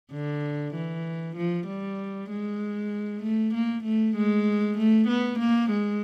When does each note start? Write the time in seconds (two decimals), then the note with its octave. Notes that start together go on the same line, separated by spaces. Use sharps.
0.12 D3
0.74 E3
1.36 F3
1.67 G3
2.30 G#3
3.23 A3
3.54 A#3
3.84 A3
4.16 G#3
4.78 A3
5.08 B3
5.39 A#3
5.71 G#3